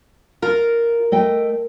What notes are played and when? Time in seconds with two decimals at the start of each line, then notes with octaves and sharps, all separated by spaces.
0.42 F4 A#4
1.12 A3 D#5 G5